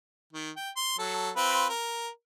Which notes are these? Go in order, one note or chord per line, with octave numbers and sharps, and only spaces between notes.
D#3
G5
C6
F#3 A4
C4 F4 B4
A#4